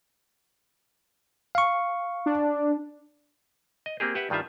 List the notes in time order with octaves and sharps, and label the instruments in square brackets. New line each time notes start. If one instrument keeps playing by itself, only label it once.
[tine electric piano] F5 C#6
[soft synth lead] D4
[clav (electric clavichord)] D#5
A#3 C4 G4 G#4
G4 B4 E5 F#5
G2 D#3 G3 F4 E5